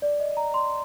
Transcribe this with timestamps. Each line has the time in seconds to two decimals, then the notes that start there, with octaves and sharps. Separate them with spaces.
0.02 D5
0.20 D#5
0.37 A#5
0.54 C6